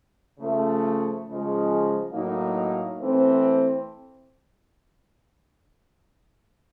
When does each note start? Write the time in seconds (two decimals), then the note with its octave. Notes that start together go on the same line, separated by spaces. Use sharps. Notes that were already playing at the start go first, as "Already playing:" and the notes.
0.39 C#3 F3 A3
1.26 C#3 F3 G#3
2.12 A2 F#3 A#3 D#4
2.99 E3 A3 C4